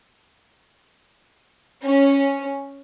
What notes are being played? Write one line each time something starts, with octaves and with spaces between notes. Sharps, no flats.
C#4